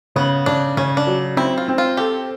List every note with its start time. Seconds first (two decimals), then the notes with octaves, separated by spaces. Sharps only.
0.16 C#3 B3
0.46 C#3 D4
0.77 C#3 C#4
0.97 D4
1.07 F#3
1.37 C4 E4
1.58 F4
1.68 C4
1.78 F4
1.97 G4 A4